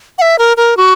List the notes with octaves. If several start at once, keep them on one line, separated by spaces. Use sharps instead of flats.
F#5
E5
A#4
A#4
F#4